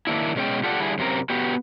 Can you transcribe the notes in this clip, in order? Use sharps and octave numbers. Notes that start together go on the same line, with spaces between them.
D#3 A#3 D4 E4
B2 G#3 C#4 B4 G5
F4 G4 A4 D5 F#5
D3 G3 E4 G#4
F#2 C3 C4 A#4
B3 F#4 G4